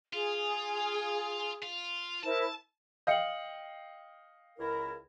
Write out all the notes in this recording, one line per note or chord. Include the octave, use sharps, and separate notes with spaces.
F4 G#4
F4
E4 A#4 C5 A5
D#5 F5 G5 G6 C#7 F#7
C#2 E4 A#4